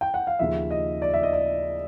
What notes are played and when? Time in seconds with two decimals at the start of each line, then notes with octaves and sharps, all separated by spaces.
0.01 G5
0.14 F#5
0.27 F5
0.39 D#2 C#3 F3 E5
0.71 D#5
1.02 D5
1.14 E5
1.23 D#5
1.33 D5